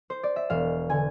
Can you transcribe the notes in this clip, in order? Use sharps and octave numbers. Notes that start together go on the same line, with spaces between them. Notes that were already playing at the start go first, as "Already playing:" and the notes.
C5
D5
E5
E1 F5
D3 G#5